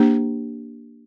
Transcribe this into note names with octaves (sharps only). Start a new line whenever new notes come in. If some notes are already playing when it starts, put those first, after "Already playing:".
Already playing: A#3 D4 G4 C5